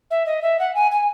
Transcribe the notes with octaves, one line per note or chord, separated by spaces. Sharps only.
E5
D#5
E5
F#5
G#5
G#5